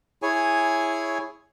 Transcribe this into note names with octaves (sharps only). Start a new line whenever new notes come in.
E4 G#4 C#5 G#5